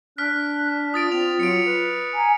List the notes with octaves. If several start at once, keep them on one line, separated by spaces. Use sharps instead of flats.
D4 F6 F#6 B6
F4 D#6 A6 D7
C4 F7
F#3 C#7 D7
B4
G#5 A#5